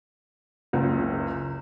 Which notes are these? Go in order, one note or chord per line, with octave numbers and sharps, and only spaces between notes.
F#1 C#2